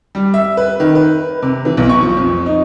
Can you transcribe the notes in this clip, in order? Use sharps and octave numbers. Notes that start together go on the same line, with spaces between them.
G3
E5
B4
D#3
B4
C3
E3
B1
C#6
F3
F2
D#4